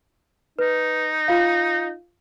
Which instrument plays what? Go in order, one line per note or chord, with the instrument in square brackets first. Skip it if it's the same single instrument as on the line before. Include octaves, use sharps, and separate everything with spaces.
[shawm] D#4 [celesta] B4
[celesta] F4 F5